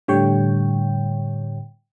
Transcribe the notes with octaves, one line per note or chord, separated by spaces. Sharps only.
A2 D3 G3 C#5 G5